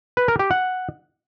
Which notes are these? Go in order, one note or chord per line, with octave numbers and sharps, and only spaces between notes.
B4
A#4
G4
F#5